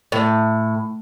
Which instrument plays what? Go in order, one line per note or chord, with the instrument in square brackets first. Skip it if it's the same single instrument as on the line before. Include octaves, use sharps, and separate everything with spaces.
[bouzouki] A2